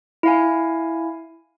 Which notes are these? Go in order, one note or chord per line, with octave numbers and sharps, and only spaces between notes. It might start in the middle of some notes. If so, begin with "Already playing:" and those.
E4 F5 G#5